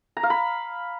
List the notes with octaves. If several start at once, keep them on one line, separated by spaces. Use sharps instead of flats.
A#5
F5
B5